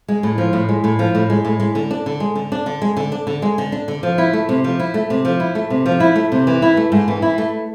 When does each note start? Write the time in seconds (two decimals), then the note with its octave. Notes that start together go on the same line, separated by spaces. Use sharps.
0.08 G#3
0.23 A2
0.38 F3
0.53 A2
0.69 G#3
0.84 A2
0.99 F3
1.15 A2
1.30 G#3
1.45 A2
1.60 G#3
1.75 D3
1.91 D4
2.06 D3
2.20 G#3
2.35 D3
2.52 D4
2.66 D3
2.82 G#3
2.97 D3
3.12 D4
3.27 D3
3.42 G#3
3.58 D3
3.72 D4
3.88 D3
4.03 F3
4.18 E4
4.33 A3
4.49 C3
4.64 F3
4.79 E4
4.94 A3
5.10 C3
5.25 F3
5.40 E4
5.55 A3
5.70 C3
5.86 F3
6.00 E4
6.16 A3
6.32 C3
6.47 E3
6.62 E4
6.77 A3
6.92 G#2
7.08 E3
7.22 E4
7.38 A3